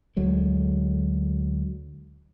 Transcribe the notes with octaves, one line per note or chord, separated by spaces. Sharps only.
D2 D3 F#3 G#3